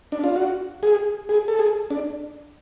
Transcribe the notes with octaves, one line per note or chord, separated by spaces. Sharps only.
D4
F4
F#4
G#4
G#4
A4
G#4
D4